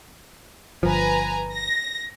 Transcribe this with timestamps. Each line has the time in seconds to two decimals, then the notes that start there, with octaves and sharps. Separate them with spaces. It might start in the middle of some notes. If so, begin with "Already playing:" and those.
0.83 G1 F3 B4 G#5 A#5
1.53 A#6